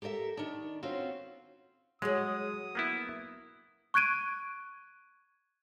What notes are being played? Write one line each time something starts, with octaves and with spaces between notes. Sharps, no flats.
G4 A4 A#4 D#5 E5
D#3 D4
C4 C#4 F4 F#4
F#3 G#3 G#4 D#6
A#3 B3 E4
C#6 F#6 G#6 D7 D#7